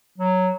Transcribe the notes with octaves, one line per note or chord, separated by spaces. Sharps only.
F#3